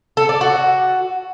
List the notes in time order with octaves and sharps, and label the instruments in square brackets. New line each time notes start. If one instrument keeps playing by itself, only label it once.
[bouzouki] A4
D5
F#4